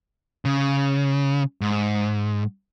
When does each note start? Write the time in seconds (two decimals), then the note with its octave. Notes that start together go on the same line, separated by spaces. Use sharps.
0.45 C#3
1.61 G#2